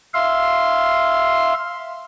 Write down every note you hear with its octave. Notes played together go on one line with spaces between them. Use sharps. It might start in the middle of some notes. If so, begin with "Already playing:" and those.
E5 F5 C6